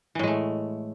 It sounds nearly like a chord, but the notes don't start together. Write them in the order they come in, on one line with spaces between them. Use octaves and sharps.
E3 A2 G#3 A3